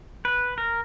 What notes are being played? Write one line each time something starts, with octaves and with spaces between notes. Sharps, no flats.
B4
A#4